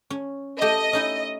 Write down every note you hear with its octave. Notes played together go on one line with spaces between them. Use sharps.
C#4
A3 G4 D#5
C#4 D#4 E4